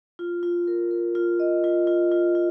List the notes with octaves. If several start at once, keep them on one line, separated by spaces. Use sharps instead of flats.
F4
F4
A#4
A#4
F4
D#5
F4
F4
F4
F4